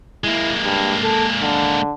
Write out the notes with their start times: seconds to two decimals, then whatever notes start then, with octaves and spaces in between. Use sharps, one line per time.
0.24 G#3 A#3 E4
0.64 G2
1.03 A4
1.42 D3